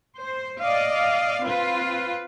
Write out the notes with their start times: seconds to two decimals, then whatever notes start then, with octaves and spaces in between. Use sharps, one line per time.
0.19 C5
0.61 D5 D#5 F5
1.43 C4 F4 B4